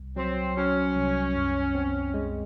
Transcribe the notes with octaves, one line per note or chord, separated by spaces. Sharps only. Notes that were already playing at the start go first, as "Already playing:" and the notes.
Already playing: C2
F#3 C4
F#3 C#4
C2
F#2
C4
G#3